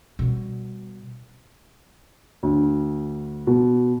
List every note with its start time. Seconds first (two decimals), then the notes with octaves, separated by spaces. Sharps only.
0.19 B2 G3
2.43 D2
3.47 B2